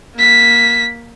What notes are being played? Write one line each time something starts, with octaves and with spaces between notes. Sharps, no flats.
A#3 B6